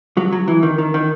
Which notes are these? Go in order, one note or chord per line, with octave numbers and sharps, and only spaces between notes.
F#3
F#3
E3
D#3
D#3
D#3